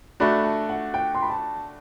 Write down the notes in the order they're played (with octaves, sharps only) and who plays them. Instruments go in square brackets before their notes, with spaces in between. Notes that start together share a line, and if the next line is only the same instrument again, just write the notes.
[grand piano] A3 D4 F#4 [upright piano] B5
[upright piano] A5
F#5
G5
C6
B5
A5